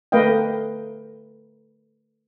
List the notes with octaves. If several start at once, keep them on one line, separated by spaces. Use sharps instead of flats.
A3 A#4 B4 D#5 F5 G5